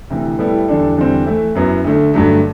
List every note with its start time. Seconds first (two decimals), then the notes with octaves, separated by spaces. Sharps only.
0.10 D2 C3 E3
0.39 A2 G3 B3 E4 A4
0.68 E2 D3 G3 D4 A4
0.98 E2 D3 G3 C4
1.26 E3 A3 E4 A4
1.55 F#2 F#3 B3 E4
1.84 D2 D3 A3
2.14 G2 D3 F#3 A3